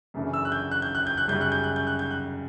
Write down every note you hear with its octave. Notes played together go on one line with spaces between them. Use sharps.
F#2 C#3 E3 A3 D4
E6
F#6
G6
F#6
G6
F#6
G6
F#6
F#2 C#3 G3 G6
F#6
G6
F#6
G6
F#6
G6
F#6